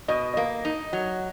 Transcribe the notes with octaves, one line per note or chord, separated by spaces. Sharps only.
B2 D#5
A#3 D#5
D#4
F#3